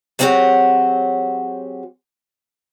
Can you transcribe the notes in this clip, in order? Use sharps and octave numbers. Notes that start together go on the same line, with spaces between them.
F#3 G#3 C4 F#4 G4 C#5